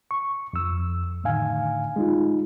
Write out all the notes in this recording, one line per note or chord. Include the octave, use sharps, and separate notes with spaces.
C#6
F2 E6
A2 D3 D#3 F5 G#5
G#3 D#4 F4